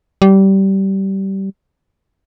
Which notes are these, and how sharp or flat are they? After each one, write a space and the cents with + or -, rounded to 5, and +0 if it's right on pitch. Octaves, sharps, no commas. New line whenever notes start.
G3 -20